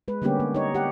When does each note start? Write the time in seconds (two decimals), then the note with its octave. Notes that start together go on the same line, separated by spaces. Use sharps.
0.08 G#3 B4
0.22 D3 G3 A#3 B3 C#4 G4
0.40 A#3
0.55 D#4 C#5
0.74 G4 F#5